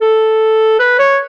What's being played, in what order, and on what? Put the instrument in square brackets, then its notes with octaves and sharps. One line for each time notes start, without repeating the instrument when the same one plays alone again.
[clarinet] A4
B4
C#5